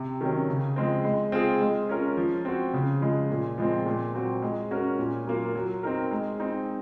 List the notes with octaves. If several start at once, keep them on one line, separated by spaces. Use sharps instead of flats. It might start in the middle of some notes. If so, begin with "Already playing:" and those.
Already playing: C3
D#3 F#3 C#4
C#3
F3 G#3 C4
G#3
C4 F4 G#4
G#3
C#4 F4 A#4
F3
C4 F#4
C#3
F3 G#3
A#2
F3 G#3 C4
A#2
F#3 C4 F#4
G#3
C#4 F#4 A#4
A#2
F#3 A#3 F4
F#3
C4 D#4 A#4
G#3
C4 D#4